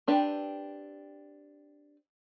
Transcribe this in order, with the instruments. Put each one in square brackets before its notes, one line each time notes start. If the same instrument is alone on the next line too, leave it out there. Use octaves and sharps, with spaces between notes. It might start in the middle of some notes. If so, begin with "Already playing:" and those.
[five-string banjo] C4 D4 G4 B4